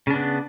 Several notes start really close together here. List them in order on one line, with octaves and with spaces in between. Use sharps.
C#3 D4 B3